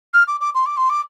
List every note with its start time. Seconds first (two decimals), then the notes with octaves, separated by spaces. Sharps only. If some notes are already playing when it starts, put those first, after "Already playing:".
0.13 F6
0.27 D6
0.40 D6
0.54 C6
0.66 D6
0.77 C6
0.89 D6